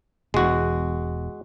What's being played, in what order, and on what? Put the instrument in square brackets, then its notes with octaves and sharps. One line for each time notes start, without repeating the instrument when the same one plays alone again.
[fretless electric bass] E1 E2 [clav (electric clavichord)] G#3 F#4